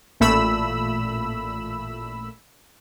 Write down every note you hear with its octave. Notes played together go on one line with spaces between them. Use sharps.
A1 A#2 A3 B5 E6